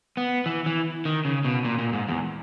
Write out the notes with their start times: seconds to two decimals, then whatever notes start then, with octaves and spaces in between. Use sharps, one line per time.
0.17 B3
0.46 E3
0.66 E3
1.05 D#3
1.25 C#3
1.45 B2
1.65 A#2
1.78 A#2
1.93 G#2
2.09 E2